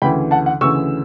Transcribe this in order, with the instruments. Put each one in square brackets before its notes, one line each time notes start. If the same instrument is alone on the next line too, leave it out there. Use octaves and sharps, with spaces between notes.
[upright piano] D2 C#3 E3 G5 B5
F#5 A5
F#5
D2 C#3 E3 C#6 E6